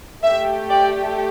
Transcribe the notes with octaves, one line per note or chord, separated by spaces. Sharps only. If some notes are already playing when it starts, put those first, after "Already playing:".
A3 G4 E5
D5 G5